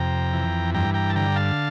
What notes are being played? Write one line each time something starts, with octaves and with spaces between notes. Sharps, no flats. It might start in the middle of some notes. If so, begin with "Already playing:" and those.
Already playing: F2 C3 G5 A#5
E3
G2 G5 A#5
G5 A#5
A5
D3 G5 A#5
F5 A5